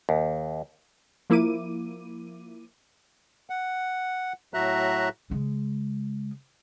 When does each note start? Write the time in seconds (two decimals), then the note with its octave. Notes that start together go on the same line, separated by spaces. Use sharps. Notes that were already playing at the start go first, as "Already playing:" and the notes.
0.09 D#2
1.30 F3 A#3 E4 D6 D#7
3.50 F#5
4.54 A2 F#3 F#4 E5 A#5 F#6
5.30 C#3 G#3